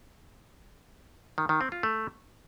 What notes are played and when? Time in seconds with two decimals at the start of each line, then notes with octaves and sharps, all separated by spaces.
1.38 D#3
1.49 D#3
1.61 C4
1.72 F4
1.83 A3